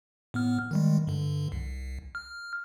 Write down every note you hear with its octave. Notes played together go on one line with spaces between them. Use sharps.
A2 B3 F6
D#3 G3 G#3
G2 D3
C2
F6